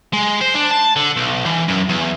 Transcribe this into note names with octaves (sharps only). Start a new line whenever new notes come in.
G#3
C5
D4
A5
D3
B1
E3
F#2
E2